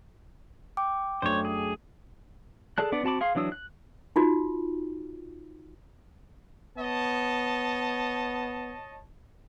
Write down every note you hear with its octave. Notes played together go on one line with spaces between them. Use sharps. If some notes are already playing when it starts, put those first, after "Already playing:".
G5 D6
F#2 A3 D4 C5 C#5
G#4
G#4 A4 D5 A5 F#6
B3 D4 D5 D6
C4 F#4 A5 B5 D6
G#4 F5 C6
E3 F#3 D4 D#6 E6
F#6
D#4 F4 F#4
B3 C#5 D#5 A5